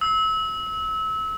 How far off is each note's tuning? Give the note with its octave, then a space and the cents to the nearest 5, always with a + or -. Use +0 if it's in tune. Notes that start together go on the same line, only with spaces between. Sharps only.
E6 -30